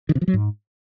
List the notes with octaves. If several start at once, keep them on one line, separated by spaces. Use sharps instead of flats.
D#3
C3
F3
F#3
G#2